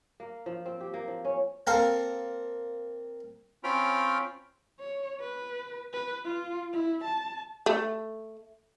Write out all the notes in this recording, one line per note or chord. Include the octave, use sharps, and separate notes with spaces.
A#3
F3
C4
G4
A#3
F3
C#4
A#3 C4 A4 A#4 F5 G5
C4 C#4 F4 G5 B5 F6
C#5
B4
B4
F4
E4
A5
A3